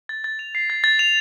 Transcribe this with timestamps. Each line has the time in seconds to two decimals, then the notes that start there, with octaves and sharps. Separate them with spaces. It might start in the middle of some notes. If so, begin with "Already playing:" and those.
0.09 A6
0.24 A6
0.39 F7
0.55 C7
0.70 A6
0.84 A6
0.99 F7